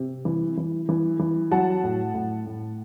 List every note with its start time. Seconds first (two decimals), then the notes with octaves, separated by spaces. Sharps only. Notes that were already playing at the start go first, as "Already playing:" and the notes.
Already playing: C3
0.25 E3
0.57 E3
0.89 E3
1.19 E3
1.51 F#3 F#5 A5
1.84 A2
2.14 A2
2.46 A2